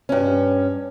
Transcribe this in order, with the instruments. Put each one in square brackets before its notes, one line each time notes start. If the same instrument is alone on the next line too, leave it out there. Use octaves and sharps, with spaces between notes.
[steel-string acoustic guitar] G2 C#4